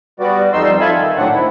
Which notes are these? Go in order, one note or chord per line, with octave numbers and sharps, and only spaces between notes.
G3 B3 F#4 D5
F2 G3 D#4 C6 E6
F4 A4 E5 G#5 B5
D#3
A2 F#3 C4 D4 F#5
E4